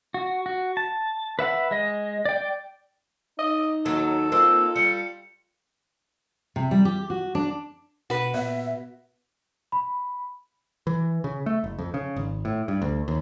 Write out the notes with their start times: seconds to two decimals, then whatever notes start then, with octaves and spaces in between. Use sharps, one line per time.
0.14 F#4
0.46 F#4
0.77 A5
1.39 B4 E5 F#5 B5
1.71 G#3 D#5
2.25 D5 G5
3.39 D#4 D#5
3.85 D#2 F#3 A4
4.32 A#3 C4 D#4 F4 E6
4.76 G3 C#7
6.56 C3
6.71 G3
6.85 G4
7.10 F#4
7.35 D4
8.10 B2 F#4 B4
8.34 A#2 B3 E5
9.72 B5
10.87 E3
11.24 C#3
11.46 A3
11.64 F#1
11.79 F2
11.94 C#3
12.16 G#1
12.45 A2
12.68 G2
12.82 D2
13.08 D#2